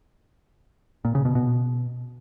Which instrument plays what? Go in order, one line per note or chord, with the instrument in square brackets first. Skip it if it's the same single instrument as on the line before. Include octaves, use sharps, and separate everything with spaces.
[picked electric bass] A#2
C#3
B2
B2